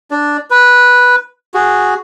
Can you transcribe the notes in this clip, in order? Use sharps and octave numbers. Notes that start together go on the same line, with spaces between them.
D4 D5
B4
F#4 G#4